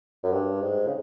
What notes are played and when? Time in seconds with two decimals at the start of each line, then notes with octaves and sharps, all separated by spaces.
0.23 F#2
0.32 G2
0.61 G#2
0.87 C#3